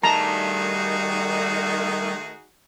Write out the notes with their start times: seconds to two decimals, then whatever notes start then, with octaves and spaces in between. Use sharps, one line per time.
0.04 D#3 G3 A3 D#4 F#4 G#4 A5 A#5